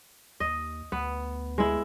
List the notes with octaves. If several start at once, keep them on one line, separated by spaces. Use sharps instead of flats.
D#2 D#5
D2 B3
G#3 E4